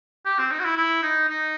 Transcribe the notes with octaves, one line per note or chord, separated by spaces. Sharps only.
G4
C4
D#4
F#4
E4
E4
D#4
D#4